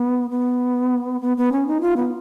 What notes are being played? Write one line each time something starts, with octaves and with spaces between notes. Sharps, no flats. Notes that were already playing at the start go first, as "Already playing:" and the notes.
Already playing: B3
B3
B3
B3
C#4
D#4
F4
B3